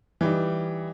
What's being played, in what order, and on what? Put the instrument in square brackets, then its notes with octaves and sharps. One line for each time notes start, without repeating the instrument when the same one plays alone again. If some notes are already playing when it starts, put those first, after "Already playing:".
[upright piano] E3 G3 D#4